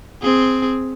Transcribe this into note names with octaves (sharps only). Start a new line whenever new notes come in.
C4 G#4